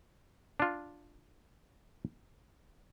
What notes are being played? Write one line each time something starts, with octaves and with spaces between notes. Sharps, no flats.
D4 F4